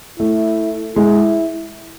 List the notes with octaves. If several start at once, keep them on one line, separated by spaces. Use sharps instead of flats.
A3 E4
G#3 E4